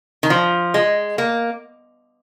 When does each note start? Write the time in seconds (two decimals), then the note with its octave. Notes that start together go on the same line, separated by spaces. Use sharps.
0.23 D#3
0.30 F3
0.74 G#3
1.18 A#3